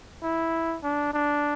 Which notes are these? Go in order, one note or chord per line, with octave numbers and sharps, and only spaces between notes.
E4
D4
D4